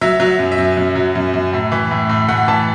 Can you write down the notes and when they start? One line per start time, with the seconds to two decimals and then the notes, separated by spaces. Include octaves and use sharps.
0.01 F#3 E5
0.20 F#3
0.26 E5
0.39 F#2
0.52 E5
0.58 F#2
0.77 F#2
0.96 F#3
1.15 F#2
1.34 F#2
1.53 A2
1.72 E3
1.91 A2
2.09 A2
2.29 A2 F#5
2.48 E3 A5